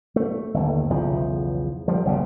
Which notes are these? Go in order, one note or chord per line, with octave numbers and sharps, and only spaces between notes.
A3
G1 D#2
B1 E2 C#3 F3
F3 G3
F#1 B1 C#3